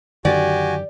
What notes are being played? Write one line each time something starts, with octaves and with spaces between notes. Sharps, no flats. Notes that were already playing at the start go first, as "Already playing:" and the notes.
F#2 D3 D#3 F#4 G4 D5 G#5